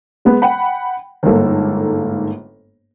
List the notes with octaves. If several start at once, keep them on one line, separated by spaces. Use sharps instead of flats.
G#3 B3
F#5 G5 B5
G1 G#2 A#3 A4